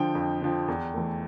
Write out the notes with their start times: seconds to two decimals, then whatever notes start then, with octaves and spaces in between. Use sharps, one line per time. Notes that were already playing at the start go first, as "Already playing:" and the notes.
Already playing: D3 F3 G5
0.15 F2
0.42 D3 F3
0.68 E2
0.94 E3 A3